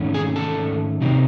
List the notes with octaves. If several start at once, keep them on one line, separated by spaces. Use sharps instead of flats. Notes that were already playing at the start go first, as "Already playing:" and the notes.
Already playing: G#2 D#3 A3 C#4
G#4 G#5
A4 A5
C3 F#3 C4 D#4